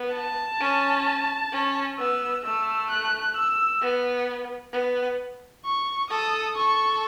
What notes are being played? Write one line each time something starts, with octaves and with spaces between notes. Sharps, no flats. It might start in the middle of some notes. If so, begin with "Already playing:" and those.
Already playing: B3
A5
C#4
C#4
B3 E6
A3 E6
F#6
E6
B3
B3
C#6
A4 D#6
A4 C#6